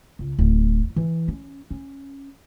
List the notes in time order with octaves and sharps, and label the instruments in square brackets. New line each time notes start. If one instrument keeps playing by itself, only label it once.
[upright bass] C#2
D1
E3
C#4
C#4